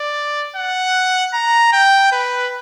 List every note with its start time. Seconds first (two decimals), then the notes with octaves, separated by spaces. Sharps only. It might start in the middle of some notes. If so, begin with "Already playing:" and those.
Already playing: D5
0.56 F#5
1.34 A#5
1.73 G5
2.12 B4